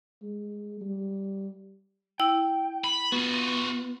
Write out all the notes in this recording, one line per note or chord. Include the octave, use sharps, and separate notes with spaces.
G#3
G3
E4 G5 E6
B5
B3 F4 F#4